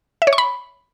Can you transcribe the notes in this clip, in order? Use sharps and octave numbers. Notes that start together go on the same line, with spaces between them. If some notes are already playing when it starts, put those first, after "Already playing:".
E5
C#5
C#6
B5